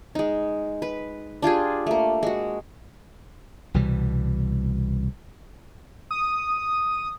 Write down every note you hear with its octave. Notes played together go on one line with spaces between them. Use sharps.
G#3 D#4
B4
D4 F4 G4 G#4
A3 A#3
G#3 F#4
C2 B2 E3 G3
D#6